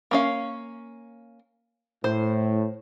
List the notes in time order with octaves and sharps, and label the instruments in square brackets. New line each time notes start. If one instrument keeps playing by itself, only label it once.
[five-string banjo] A#3 C#4 F5
[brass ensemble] A2 [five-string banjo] C5